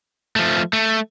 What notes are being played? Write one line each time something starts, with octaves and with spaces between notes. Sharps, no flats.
F3 A3
A3